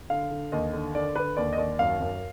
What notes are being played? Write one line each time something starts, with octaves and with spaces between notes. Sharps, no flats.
D3 F5
D3
D#2 D#5
D3
D3 D5
D3 B4
D#2 D5
D#5
D#2 D5
F#2 F5
F#2